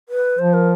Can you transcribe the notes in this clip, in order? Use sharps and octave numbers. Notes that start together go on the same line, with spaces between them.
B4
F3 C5
A#4